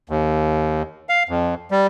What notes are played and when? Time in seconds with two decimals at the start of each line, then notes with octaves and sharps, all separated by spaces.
0.09 D#2
1.09 F5
1.29 F2
1.71 G3